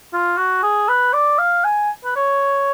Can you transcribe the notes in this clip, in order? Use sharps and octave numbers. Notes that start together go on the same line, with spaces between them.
F4
F#4
G#4
B4
D5
F5
G#5
B4
C#5